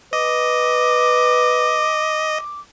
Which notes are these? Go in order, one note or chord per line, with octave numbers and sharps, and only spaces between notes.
B4 D#5 D6